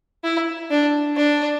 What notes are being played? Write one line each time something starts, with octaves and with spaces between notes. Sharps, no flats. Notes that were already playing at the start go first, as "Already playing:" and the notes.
E4
D4
D4